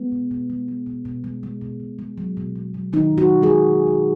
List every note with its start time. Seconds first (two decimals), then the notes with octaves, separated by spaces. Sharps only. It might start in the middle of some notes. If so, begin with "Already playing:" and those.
Already playing: G#3 B3
0.12 B2
0.31 B2
0.50 G#3
0.68 G#3
0.86 B2
1.05 B2
1.24 G#3
1.43 G#3
1.61 B2
1.80 B2
1.99 G#3
2.18 F#3
2.37 B2
2.56 B2
2.74 F#3
2.93 D#3 F#3 D#4
3.11 B2
3.18 F#3 F#4
3.30 B2
3.42 G#3 G#4
3.50 F#3
3.67 F#3
3.87 B2